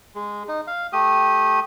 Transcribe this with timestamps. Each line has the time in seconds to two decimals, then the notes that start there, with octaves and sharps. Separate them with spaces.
0.15 G#3
0.48 D#4
0.67 F5
0.93 A3 G4 D#6